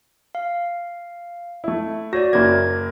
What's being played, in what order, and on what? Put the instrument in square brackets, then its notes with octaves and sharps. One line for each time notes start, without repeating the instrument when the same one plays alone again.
[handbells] F5
[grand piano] A3 E4
[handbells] F#4 C#5 D5 [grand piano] A#6
[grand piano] F#1 A#3 [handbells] G#6